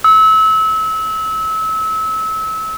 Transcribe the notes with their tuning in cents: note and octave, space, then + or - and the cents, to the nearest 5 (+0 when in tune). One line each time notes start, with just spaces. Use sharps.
E6 -30